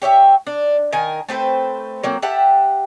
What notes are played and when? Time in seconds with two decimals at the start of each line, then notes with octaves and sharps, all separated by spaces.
0.02 G4 C#5 D#5 E5
0.47 D4
0.93 D#3 A#4 G#5
1.29 A3 C4 B4 C5
2.04 F#3 A#3 C4
2.22 G4 E5 F#5 A5